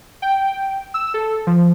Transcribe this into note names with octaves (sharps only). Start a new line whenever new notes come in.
G5
E6
A4
F3